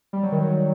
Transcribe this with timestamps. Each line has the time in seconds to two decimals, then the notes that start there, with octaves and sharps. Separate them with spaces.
0.13 G3
0.23 F#3
0.32 D#3
0.42 F#3